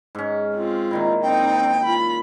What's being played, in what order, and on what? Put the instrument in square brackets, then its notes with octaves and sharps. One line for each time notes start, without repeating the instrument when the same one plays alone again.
[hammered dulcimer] G#2 C#4
[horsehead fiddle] C4 F4
[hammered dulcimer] A#2 D#3 E4
[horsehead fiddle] C4 D#4 [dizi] G5
[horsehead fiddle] F4 B5